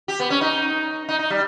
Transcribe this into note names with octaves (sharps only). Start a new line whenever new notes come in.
G4
B3
C#4
D#4
D#4
D#4
G3